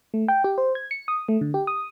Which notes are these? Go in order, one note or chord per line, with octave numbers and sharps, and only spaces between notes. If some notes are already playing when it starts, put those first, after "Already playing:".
A3
G5
G4
C5
G#6
C#7
D#6
A3
D3
G4
D#6